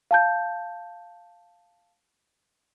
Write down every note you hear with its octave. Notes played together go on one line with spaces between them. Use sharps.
F5 A5 G6